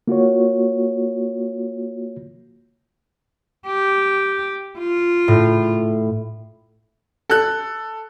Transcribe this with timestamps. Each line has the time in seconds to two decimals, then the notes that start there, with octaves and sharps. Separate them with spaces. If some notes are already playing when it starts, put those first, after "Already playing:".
0.08 A#3 F4 F#4 C#5
3.67 G4
4.79 F4
5.28 A2
7.30 A4 F#6